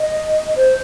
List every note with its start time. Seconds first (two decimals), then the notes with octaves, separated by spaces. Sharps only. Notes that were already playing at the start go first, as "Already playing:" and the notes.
Already playing: D#5
0.56 C5